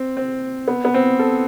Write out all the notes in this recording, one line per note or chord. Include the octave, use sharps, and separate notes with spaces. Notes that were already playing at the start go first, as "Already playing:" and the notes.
Already playing: C4
C4
B3
B3
C4
A4